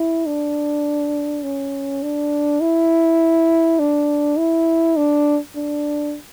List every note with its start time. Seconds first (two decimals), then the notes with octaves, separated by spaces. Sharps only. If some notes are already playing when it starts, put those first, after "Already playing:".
Already playing: E4
0.26 D4
1.43 C#4
2.02 D4
2.61 E4
3.79 D4
4.38 E4
4.97 D4
5.56 D4